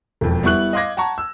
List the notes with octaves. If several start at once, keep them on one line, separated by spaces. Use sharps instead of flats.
E1 F2
G3 B3 E4 C#6 F#6 F#7
D#5 F5 C6 D6 G#6 A#6
F#5 A5 A#5 C#6
E6